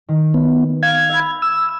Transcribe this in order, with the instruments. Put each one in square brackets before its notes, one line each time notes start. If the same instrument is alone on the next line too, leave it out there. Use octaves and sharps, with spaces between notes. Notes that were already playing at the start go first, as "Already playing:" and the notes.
[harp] D#3
[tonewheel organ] B3
F5 G#6
[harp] E5 B5
[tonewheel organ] E6